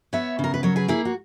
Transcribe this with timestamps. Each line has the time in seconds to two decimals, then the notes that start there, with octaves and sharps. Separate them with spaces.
0.13 B3 C#5 E5
0.39 C#3
0.44 A#4
0.54 B4
0.63 F#3 A#4 C#5
0.76 G#4 B4
0.88 A#3 E4 G#4
1.05 F#4